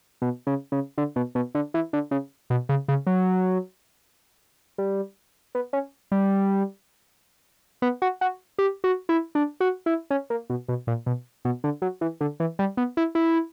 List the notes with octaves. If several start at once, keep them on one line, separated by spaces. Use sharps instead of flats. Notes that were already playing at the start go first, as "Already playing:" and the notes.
B2
C#3
C#3
D3
B2
B2
D3
E3
D3
C#3
B2
C#3
C#3
F#3
G3
B3
C#4
G3
B3
F#4
F#4
G4
F#4
E4
D4
F#4
E4
C#4
A#3
B2
B2
A#2
B2
B2
D3
F#3
E3
D3
E3
G3
B3
E4
E4